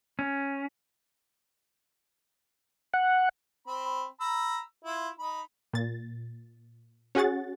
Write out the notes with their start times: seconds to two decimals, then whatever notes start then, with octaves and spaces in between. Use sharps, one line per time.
0.19 C#4
2.93 F#5
3.67 C4 B5
4.21 A#5 B5 E6
4.85 E4 F4
5.19 D#4 B5
5.73 A#2 A6
7.15 C#4 F#4 G#4 F#5 A6